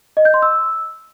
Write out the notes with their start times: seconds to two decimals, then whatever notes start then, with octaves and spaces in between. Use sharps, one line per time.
0.17 D#5
0.25 G6
0.34 C6
0.42 E6